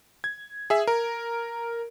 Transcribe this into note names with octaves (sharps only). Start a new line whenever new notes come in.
G#6
G#4 E5
A#4